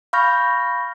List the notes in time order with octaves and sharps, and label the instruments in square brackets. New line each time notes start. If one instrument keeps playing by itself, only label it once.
[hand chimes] F5 B5 C#6 F6 G6 A#6